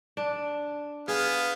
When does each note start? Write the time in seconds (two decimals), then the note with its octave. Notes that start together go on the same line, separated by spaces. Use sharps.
0.17 D4
1.08 B3 G#4 F5